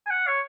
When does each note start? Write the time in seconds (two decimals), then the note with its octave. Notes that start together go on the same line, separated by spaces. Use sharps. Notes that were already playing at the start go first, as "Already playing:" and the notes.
0.06 G#5
0.11 F#5
0.27 C#5